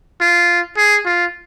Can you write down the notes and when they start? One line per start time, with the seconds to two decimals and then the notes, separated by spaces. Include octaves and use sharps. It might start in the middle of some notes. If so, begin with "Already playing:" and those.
0.21 F4
0.77 G#4
1.05 F4